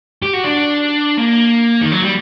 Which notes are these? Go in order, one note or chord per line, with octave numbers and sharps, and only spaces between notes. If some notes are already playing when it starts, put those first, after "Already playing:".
G4
F#4
D4
A#3
D#3
F#3
G3